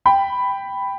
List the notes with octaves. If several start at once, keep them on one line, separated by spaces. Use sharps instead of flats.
G5 B5